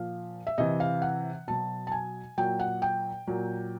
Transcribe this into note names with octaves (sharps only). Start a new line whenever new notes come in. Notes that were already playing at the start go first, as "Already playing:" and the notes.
Already playing: A#2 F3 F5
E5
C3 E3 D#5
F5
F#5
B2 F#3 A5
A5
G#5
A#2 F#3 G5
F#5
G5
A#2 F#3